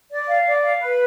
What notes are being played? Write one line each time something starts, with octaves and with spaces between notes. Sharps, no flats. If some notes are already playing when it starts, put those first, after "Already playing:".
D5
F5
D5
F5
B4